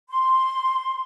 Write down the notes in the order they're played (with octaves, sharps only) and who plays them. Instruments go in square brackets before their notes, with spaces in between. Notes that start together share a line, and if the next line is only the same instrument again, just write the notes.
[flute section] C6